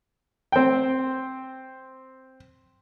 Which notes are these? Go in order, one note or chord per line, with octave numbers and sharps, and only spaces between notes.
C4 G5